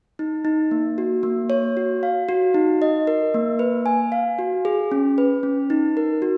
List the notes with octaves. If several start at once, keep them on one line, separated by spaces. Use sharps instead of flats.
D#4
D#4
A#3
F#4
A#3
C#5
F#4
F5
F#4
D#4
D#5
A#4
A#3
B4
G#5
F5
F#4
G#4
C#4
B4
C#4
D#4
A#4
F#4